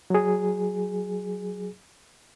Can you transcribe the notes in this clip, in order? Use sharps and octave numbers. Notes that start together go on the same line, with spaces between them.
F#3 G#4